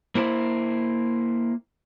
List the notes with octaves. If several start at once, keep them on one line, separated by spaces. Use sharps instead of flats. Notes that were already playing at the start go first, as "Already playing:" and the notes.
A#3 E4 C5